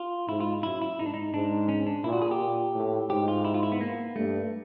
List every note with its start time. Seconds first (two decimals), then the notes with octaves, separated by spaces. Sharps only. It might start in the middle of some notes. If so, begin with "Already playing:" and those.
Already playing: F4
0.28 G#2 E4
0.40 F4
0.63 F#2 E4
0.82 E4
0.99 G#2 D#4
1.06 D4
1.14 D#4
1.34 G#2 D4
1.69 C#4
1.87 D4
2.04 A#2 E4
2.13 F#4
2.22 G#4
2.31 G4
2.40 A#2
2.75 A2
3.09 G#2 G4
3.28 F4
3.45 E4
3.54 F4
3.63 E4
3.72 B3
3.81 A#3
4.16 G2 A3